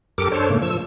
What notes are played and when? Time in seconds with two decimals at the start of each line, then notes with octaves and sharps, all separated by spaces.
0.18 F#2 G4 A4 A#4 D6
0.32 D4 A4 C5 C#5
0.49 G#2 C#3 A3 A#3
0.62 F3 E6